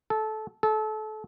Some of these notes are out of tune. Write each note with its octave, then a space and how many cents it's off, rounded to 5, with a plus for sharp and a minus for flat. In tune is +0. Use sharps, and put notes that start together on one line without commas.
A4 -20
A4 -30